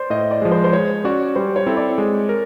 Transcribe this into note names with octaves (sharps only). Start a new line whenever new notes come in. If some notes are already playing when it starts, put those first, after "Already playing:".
Already playing: C5 D5
A2 D#5
D5
F3 G#3
C5
C5
G#3 C#5
C#4 F#4 D5
G3 C5
C#5
C4 E4 A4
D5
G#3
A#4